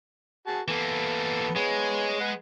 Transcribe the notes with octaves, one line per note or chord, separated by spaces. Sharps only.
F#4 G#4 A5
E3 A#3 B3 A4
G#3 B3 G#4 C#5
B4 F#5